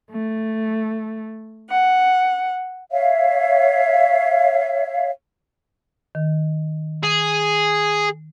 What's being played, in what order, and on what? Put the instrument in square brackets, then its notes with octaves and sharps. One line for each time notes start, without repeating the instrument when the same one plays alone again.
[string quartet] A3
F#5
[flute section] C#5 E5 F5
[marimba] D#3
[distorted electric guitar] G#4